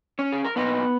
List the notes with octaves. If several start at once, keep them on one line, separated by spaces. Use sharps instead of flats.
C#4 C#5
G#4
A#4
B2 A#3 B3 D#4 B4